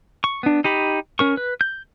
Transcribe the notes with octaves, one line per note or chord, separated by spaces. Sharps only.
C#6
B3 D4
D#4 G4 B5
C#4 A#4 C#6
B4
G6